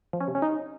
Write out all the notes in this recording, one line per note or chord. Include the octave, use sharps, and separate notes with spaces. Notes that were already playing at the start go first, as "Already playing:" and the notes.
F3
C#4
C3
C#4
D#4